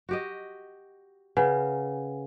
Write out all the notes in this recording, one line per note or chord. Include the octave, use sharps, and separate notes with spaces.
F#4 G4 D#5
C#3 B4 F#5 G#5